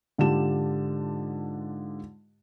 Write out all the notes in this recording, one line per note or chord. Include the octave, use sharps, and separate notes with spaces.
G#2 D3 F4 G4 A5 E7